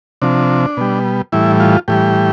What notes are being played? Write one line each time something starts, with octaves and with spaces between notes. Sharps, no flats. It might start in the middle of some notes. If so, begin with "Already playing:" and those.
C3 F3 D4
B2 G3
A2 E3 G3 E4
F4
A2 E3 G3 G4